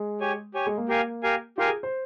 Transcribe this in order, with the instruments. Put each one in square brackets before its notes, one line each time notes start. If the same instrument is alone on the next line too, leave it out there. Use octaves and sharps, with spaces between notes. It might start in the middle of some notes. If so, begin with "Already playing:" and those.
Already playing: [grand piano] G#3
[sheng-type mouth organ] G4 C#5 G#5
G4 C#5 G#5
[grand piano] G#3
A#3
[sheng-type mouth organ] G4 A#4 F5 G#5
G4 A#4 F5 G#5
[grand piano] F4 [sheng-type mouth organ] G4 A#4 F5 G#5
[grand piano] G#4
C5